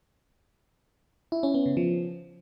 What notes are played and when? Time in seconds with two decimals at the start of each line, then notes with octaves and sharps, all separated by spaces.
1.32 E4
1.43 C#4
1.54 B3
1.66 C#3
1.77 F3